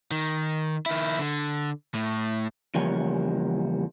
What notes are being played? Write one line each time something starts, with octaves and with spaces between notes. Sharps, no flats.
D#3
D#3 E4
D3
A2
E2 C#3 F3 G3 A#3 C#5